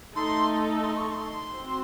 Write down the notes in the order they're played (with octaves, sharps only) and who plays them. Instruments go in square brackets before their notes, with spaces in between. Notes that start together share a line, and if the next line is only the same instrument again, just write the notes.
[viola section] A3 D#4 A4 [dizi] C6
[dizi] C6
C#6
C6
[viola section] C4 F#4 C5